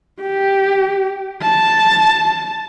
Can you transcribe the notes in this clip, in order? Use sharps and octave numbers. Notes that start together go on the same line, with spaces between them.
G4
A5